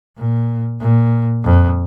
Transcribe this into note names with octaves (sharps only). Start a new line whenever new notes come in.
A#2
A#2
F2